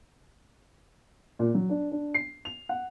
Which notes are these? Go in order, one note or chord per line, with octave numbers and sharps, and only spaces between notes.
A#2
F#3
D4
D4
C7
F7
F#5